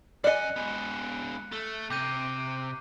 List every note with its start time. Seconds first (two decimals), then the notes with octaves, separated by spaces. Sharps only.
0.24 F#2 D5 D#5 G#5 F6 F#6 C#7
0.56 G#3 B3
1.52 A3
1.90 C3 D6 G6 D#7